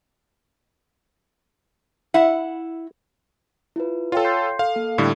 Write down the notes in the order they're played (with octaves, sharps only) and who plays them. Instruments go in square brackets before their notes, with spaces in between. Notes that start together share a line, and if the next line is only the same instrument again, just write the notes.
[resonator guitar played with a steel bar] E4 F#5 [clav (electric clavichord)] E5
[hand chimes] E4 F4 B4
[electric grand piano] F4 A4 [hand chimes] C#5 F5 G5
[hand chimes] C6 G6 C7
[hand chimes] A4 [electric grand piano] F5
[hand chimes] A#3 A4
[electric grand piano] A2 D3 G3